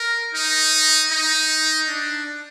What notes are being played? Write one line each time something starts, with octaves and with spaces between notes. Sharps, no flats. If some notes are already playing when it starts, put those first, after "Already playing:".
Already playing: A#4
D#4
D#4
D4